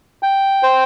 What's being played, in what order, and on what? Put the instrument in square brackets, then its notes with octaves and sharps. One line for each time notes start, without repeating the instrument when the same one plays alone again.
[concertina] G5
C5